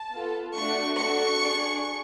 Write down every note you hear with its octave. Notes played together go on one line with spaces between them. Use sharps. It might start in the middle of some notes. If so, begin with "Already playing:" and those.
Already playing: A5
B3 F4 A4
A3 D4 F#4 C#6
D4 F#4 A4 C#6
D4 G#4